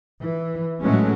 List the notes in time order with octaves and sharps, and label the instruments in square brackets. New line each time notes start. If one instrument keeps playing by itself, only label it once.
[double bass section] E3
A2 E3 F#3 G#3 A3 C#4